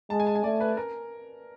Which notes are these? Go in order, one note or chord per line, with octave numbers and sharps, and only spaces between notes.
G#3 A5
G#5
A5
G#5
A3 D5
B4
A#4